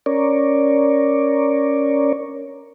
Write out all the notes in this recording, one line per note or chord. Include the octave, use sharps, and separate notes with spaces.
C#4 A#4 C#5 D5